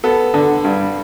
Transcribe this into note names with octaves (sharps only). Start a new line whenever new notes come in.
B3 A4
D3
G2